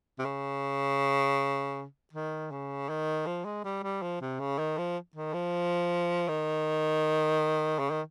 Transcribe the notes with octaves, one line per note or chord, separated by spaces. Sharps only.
C3
C#3
D#3
C#3
D#3
F3
G#3
G3
G3
F3
C3
C#3
D#3
F3
D#3
F3
D#3
C#3
D#3